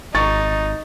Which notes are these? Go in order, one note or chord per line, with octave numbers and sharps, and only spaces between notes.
G#1 D#4 C#6 A6